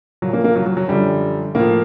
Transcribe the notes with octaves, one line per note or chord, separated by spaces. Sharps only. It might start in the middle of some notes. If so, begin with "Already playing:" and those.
A#2 F3 F#3
A#3
A#3
F#3
F#3
F#3
F#2 D3 F3 G3
A2 F3 A#3